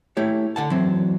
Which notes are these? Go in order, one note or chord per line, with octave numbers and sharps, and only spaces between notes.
A3 E4 G4 C#5
D3 F#5 A5
E3 F#3 C4